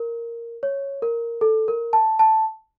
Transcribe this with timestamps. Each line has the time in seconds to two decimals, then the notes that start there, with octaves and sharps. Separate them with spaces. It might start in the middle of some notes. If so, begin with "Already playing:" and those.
Already playing: A#4
0.63 C#5
1.02 A#4
1.41 A4
1.68 A#4
1.93 A5
2.19 A5